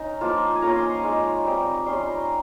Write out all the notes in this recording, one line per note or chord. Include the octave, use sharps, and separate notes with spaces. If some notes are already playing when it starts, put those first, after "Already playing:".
Already playing: C#4 D#4 A#5
F3 A#3 F4
G#5
A#3 C#4 F4 A#5
C6
C#6
G#3 D#4
G3 C4 D#4
G3 C#4 F4 C6
A#5